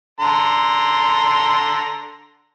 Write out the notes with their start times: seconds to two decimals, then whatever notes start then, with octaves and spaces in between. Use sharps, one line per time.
0.20 D3 A#5 C6